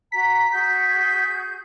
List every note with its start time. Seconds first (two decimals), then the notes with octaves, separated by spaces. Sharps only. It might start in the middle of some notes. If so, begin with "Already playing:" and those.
0.12 F#4 A#5 B6
0.52 F#4 G#4 G6